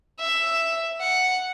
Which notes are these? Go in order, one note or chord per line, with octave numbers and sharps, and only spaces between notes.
E5
F#5